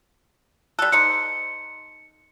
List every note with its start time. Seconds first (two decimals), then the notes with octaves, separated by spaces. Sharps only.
0.79 G3 A4 F#6
0.92 D#4 A4 C5 C#7